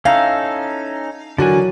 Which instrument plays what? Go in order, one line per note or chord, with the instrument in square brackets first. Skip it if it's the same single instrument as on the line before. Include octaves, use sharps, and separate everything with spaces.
[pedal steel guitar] C#4 D#4 A4 [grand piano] E4 A#5 [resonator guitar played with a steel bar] F5
[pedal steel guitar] D3 G#5 [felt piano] E3 F#3 [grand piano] D4 F#4 A#4